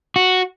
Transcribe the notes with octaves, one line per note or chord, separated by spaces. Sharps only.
F#4